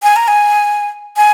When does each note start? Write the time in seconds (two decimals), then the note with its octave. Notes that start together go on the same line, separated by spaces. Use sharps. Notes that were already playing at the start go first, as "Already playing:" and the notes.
0.03 G#5
0.16 A#5
0.28 G#5
1.17 G#5